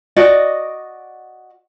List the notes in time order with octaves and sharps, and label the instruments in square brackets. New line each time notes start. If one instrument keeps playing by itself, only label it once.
[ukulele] F#4 D5 D#5